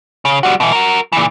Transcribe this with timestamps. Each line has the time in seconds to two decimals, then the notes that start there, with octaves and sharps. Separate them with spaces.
0.25 C#3
0.43 G3 F#4
0.60 B2 E3
0.72 F#4 A#4
1.12 A#2 E3